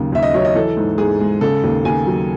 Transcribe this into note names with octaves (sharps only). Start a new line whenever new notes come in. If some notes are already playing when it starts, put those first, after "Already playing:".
Already playing: D#2 C#3 F#3
D#2 E5
D#5
F#3 C#5
D#5
E3 A4
G#2
G#2 G#4
G#3
C#3 A4
D#2
D#2 G#5
F#3